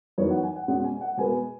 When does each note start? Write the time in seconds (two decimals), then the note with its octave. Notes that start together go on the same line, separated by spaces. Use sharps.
0.18 F#2 E3 B3 D#4 C#5
0.30 F#5
0.43 G#5
0.56 F#5
0.68 B2 G#3 C#4 F#5
0.84 G#5
1.01 F#5
1.17 B2 G#3 B3 G#5